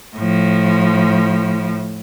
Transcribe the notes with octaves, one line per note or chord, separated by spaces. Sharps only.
A2 F3